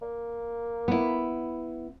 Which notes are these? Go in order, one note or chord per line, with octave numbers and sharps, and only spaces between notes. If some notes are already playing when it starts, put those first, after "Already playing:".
A#3
B3 E4